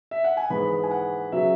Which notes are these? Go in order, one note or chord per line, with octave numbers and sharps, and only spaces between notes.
E5
F#5
G#5
G#2 E3 B3 B5
G#5
F#5
C#3 F#3 B3 E5